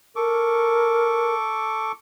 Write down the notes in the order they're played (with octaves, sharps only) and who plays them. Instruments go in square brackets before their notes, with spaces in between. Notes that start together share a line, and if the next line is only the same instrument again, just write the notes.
[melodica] A4 C#6 D6 [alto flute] A#4